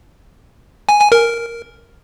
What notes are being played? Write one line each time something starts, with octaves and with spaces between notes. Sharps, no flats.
G#5
G#5
A#4